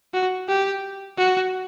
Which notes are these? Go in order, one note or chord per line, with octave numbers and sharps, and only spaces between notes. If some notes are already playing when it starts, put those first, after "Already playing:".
F#4
G4
F#4